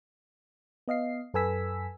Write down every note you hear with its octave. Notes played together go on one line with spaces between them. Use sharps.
B3 D#5 F5 C7
F#2 A4 B4 G#5 E6 B6